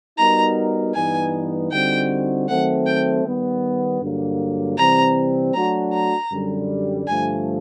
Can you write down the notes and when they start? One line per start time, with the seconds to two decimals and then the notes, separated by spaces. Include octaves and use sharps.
0.18 G3 B3 D#4 F#4 A#4 A#5
0.94 G2 E3 G3 B3 D#4 G#5
1.71 D3 G3 C4 D#4 F#4 G5
2.48 D#3 F#3 A3 C4 F#5
2.86 G5
3.24 D#3 G3 B3
4.01 G2 D3 F#3 A#3
4.77 C3 E3 G3 C4 A#5
5.54 F#3 A3 D4 F#4 A#5
5.93 A#5
6.31 F#2 D3 G3
7.08 G2 D3 F3 A3 G#5